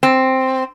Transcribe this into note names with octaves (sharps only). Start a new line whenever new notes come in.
C4